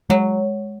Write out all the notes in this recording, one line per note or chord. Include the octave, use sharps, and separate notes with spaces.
F#3 G#3